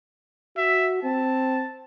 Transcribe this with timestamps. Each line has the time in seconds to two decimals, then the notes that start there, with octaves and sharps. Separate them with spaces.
0.57 F#4 E5
1.03 C4 A5